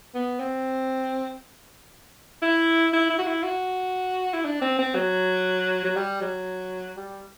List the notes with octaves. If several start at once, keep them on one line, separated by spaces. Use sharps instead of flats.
B3
C4
E4
E4
E4
F#4
E4
F#4
E4
D4
C4
C4
F#3
F#3
G3
F#3
G3